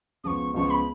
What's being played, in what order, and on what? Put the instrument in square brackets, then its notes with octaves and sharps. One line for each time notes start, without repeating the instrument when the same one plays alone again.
[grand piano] C#2 C#3 F3 B3 [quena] C#6 D#6
[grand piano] C#2 C#3 F3 B3 [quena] C#6
[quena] B5